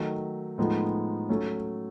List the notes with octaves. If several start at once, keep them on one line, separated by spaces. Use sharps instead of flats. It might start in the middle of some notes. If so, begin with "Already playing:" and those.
Already playing: D#3 F#3 A3
A2 F3 G#3 B3 D#4
F#3 A3 C#4